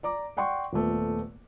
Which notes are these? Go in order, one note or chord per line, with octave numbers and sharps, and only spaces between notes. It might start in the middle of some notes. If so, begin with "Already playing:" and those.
D5 A#5 D6
D5 F#5 G5 C6 C#6
D#1 A#2 A3 B3